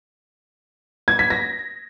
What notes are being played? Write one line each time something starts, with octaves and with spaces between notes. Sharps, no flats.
G#6
B6
A#6